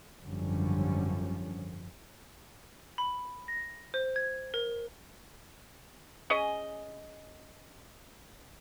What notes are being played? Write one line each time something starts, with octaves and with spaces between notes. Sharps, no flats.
G#1 F#2 D3 F3 G3 C#4
B5
A#6
C5
G#6
A#4
C#4 G#4 D#5